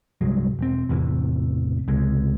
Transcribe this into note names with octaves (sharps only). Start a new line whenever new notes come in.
C2 G2 F#3 G#3
E1 C4
A1 E2 C3 E3
C#2 C3 G#3